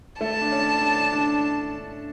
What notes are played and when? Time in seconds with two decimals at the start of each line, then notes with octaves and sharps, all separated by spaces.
0.21 A3 A5
0.42 D4
0.52 C#4
0.81 D4
1.13 D4